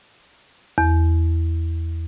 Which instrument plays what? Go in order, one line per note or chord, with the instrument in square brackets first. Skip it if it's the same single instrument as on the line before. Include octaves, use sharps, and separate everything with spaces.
[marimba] E2